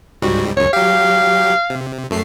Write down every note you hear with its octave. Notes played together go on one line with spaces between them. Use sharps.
C#2 G#2 G3 F#4
C#2 F#2 C#5
F#3 G4 F5
C3
F#2 A3 C7